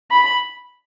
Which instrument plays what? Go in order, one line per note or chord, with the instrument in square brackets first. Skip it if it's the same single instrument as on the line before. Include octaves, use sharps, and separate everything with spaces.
[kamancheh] B5